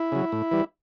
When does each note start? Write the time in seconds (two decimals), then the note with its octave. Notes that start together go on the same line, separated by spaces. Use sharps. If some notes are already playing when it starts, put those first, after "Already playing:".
Already playing: E4
0.12 C#3 F#3
0.32 A2
0.51 E3 G3